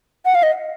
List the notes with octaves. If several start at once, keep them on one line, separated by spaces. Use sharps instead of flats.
F#5
F5
D#5